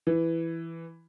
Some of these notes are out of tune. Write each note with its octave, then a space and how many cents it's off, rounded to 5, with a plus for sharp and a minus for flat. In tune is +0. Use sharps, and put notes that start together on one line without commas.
E3 +5